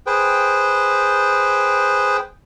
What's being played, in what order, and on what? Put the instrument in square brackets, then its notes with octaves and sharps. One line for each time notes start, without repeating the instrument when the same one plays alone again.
[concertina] G#4 B4 C5 G5